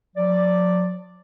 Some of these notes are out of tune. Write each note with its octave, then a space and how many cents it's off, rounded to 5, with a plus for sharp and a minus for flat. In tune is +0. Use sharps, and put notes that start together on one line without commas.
F#3 -45 D5 +0